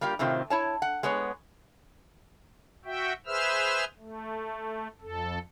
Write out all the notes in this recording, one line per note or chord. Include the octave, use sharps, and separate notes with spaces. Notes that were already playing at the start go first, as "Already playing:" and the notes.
G3 A#3 F4 G4
A2 C3 D#3 C4 F4
E4 C#5 A5
F#5
G#3 B3 G#4 C#5
F#4 E5 G5
G#4 B4 C5 E5 E6 F6
A3
F2 A4